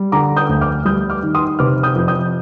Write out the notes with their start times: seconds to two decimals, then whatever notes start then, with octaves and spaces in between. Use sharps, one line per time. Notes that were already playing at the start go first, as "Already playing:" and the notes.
Already playing: G3
0.12 D3 A#5 D6
0.37 D#6 G6
0.49 D2
0.61 D6 F6
0.85 G3 D#6 G6
1.10 D6 F6
1.23 D#3
1.35 C6 D#6
1.59 C3 D6 F6
1.83 D#6 G6
1.95 F2
2.08 D#6 G6